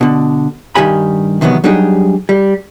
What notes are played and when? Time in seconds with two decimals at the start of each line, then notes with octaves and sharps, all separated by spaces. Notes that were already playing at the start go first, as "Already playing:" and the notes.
0.01 B2 D3
0.75 G2 D#3 G4 G#5 B5
1.41 C3 D#3 E3 F#3 B3
1.64 F#3 G3 D4 D#4 G4 G#4
2.29 G3